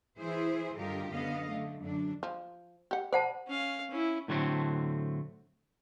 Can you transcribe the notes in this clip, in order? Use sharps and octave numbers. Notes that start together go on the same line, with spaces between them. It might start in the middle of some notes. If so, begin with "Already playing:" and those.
E3 E4 G#4 C5
G2 D3 F4 G4 A#4 D#5
F#2 D3 B3 D#5 F5
D3 A3
F#2 D3 D4
F3
G4 F#5
C5 D5 F#5 A5
C#4 F5
C#4 E4
A2 D3 F#3 A3 C4